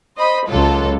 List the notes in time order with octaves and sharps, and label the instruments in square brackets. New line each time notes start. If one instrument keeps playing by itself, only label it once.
[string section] C5 D#5 B5
[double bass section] C#2 [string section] F#3 F4 A4